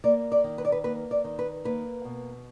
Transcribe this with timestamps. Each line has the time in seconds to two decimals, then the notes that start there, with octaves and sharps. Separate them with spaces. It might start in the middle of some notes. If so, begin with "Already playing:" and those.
0.04 A#3 D5
0.32 D5
0.44 D#3
0.58 B4
0.65 D5
0.72 B4
0.84 A#3 B4
1.11 D5
1.24 D#3
1.39 B4
1.65 A#3 B4
2.05 B2